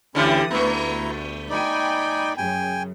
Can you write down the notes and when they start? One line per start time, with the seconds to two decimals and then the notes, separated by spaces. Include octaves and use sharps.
0.15 D2 D3 E3 C#4 E4 G4 B5 D#6
0.51 D2 A3 B3 E4 A#5
1.50 D#4 D5 G5 G#5 B5
2.38 F#2 C#3 G5 G#5